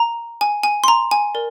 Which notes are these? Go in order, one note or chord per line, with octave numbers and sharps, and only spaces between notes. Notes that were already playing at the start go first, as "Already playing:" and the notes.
Already playing: A#5
G#5
G#5
C6
A#5
G#5
A#4 D5